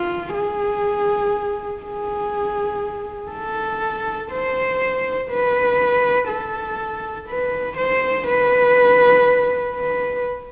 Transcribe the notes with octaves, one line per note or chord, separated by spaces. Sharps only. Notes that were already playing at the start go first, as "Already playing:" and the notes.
Already playing: F4
G#4
G#4
A4
C5
B4
A4
B4
C5
B4
B4